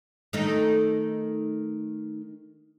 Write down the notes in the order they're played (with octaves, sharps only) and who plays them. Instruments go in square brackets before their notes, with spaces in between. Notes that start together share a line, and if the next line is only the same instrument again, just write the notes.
[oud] D#3 A3 D#4